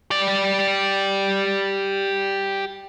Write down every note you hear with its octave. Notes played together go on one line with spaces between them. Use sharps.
G4 D5